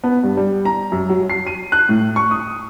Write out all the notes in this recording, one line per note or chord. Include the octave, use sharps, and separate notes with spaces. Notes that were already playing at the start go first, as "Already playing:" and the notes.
B3
G2
G3
A#5
F#2
F#3
C7
D#7
F#6
A2
C#6
D#6